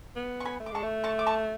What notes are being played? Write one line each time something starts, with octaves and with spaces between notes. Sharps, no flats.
B3
C#6
G#5 B5
A3
D6
G#3 A5 C#6
A3
A5 C#6
D6
A5 C#6